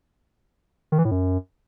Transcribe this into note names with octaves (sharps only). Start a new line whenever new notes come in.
D#3
E3
A2
F#2